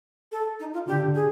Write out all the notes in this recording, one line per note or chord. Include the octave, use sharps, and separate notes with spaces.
A4
D#4
F4
D3 G4
G#4